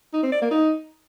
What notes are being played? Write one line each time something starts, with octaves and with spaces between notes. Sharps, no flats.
D#4
C4
D5
A#3
D#4